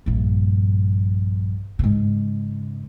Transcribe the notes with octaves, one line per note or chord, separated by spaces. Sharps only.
A#1 G2
G#2 C#3